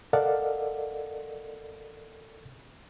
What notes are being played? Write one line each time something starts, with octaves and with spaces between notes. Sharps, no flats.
A4 A#4 D5 D#5 F5 F#5